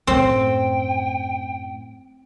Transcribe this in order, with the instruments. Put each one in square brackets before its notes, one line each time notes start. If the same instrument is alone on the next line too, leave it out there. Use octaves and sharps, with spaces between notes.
[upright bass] F#2 A2 [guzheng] C4 [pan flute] G5